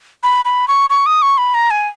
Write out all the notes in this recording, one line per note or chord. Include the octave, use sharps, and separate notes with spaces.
B5
B5
C#6
C#6
D#6
C#6
B5
A#5
G#5